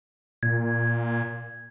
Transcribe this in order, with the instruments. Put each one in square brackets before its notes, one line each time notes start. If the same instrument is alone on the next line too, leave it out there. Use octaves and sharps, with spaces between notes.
[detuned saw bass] A#2 [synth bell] G#6